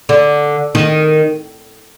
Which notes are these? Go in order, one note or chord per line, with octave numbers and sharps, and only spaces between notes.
D3
D#3